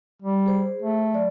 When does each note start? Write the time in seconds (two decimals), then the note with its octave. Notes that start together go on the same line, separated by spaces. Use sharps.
0.22 G3
0.46 G#4 C5
0.82 A3
1.13 F#3 D5